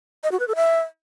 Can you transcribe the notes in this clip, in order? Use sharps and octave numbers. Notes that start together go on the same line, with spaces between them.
D#5
F#4
B4
A4
E5